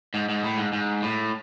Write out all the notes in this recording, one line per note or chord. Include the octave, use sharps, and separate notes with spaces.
G#2
G#2
A2
G#2
G#2
A2